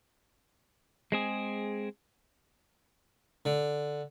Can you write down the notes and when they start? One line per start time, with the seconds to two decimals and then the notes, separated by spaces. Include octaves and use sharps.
1.12 G#3 C4 G#4
3.45 D3